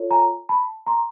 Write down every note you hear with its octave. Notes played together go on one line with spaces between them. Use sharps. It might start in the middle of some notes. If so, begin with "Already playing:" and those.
Already playing: F4 A4 C#5
G#5 A#5
A5 B5
A#5 C6